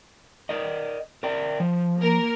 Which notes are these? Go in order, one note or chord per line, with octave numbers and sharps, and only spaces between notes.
A#4 D5 D#5
A#4 D5 G5
F3
A#3 A#4